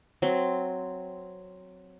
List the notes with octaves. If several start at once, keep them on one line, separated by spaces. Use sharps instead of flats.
F#3 C4